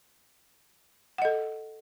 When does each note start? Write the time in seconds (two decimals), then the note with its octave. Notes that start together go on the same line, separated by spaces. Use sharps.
1.18 F#5
1.22 D#5
1.25 A4